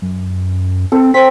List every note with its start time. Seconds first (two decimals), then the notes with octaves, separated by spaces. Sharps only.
0.02 F#2
0.92 C4 A4
1.14 C4 B6